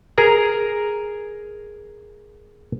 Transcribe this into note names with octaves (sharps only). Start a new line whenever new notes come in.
G#4 A#4 A#5